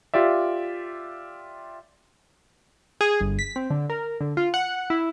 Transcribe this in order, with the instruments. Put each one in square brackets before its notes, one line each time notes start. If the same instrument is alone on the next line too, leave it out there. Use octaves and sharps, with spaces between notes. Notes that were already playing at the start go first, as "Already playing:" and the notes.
[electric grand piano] F4 G4 D5 E5
[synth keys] G#4
G1
B6
C4
D3
A#4
D3
F4
F#5
E4